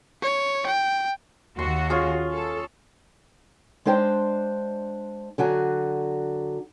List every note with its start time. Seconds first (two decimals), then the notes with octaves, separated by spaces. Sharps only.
0.22 C#5
0.66 G5
1.59 D#2 F#4 C6
1.90 C#4 F4 G#4
2.32 A4
3.85 G#3 D4 C5 F5 G5
5.38 D3 F#3 F#4 G#5